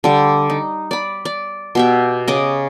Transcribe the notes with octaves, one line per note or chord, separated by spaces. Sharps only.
D3 G3
D#4
D5 B5
D5
B2 G4 E5
C#3 D#5 D6